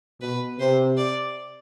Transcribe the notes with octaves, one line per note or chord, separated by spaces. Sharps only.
B2 B4
C3 C5
D5